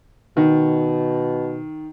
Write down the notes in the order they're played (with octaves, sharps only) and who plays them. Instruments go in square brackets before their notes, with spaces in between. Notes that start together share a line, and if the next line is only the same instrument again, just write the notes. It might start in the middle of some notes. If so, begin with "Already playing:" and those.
[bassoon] B2 [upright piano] D#3